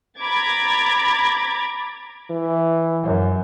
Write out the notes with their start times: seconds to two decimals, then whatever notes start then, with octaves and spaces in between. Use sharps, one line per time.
0.21 A#5 B5 D6 G#6 A6
2.31 E3
3.03 F#2